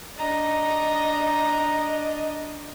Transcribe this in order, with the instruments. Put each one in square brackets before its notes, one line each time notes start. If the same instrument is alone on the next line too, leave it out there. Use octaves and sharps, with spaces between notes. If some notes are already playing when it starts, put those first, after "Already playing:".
[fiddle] D4 D#5 [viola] A#5